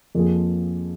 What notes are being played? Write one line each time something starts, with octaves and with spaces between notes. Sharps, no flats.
F2 F3 A#3 G#4